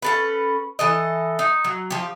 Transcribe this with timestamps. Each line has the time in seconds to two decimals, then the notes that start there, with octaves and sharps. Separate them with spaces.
0.02 C#4 A4 B4
0.79 E3 A4 D#5
1.39 D#4
1.65 F#3
1.90 F3 G4